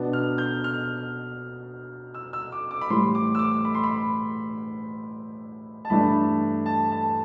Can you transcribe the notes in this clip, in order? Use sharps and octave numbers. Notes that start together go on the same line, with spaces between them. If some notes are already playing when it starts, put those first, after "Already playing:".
Already playing: B2 B3 D4
F6
G6
F6
E6
E6
D6
D6
B5
A2 E3 G3 C6
D6
E6
D6
B5
C6
B5
A5
G2 E3 A3 D4 B5
A5
A5